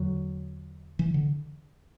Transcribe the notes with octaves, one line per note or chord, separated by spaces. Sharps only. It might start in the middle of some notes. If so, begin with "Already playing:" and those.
Already playing: E2 D3 F#3
E3
D3